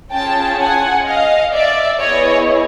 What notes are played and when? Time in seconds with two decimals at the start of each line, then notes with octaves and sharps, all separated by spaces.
0.12 C#4 F4 G#4 G5 A5
0.59 F#5 G#5
1.06 D#5 F5
1.53 D5 E5
2.01 B3 E4 G#4 C#5 D#5